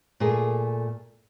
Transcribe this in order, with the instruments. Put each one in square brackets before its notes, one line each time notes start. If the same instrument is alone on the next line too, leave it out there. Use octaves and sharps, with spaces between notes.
[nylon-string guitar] A#2 A3 A#3 G#4